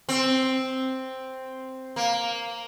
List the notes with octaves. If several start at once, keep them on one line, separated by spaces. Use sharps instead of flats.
C4
A#3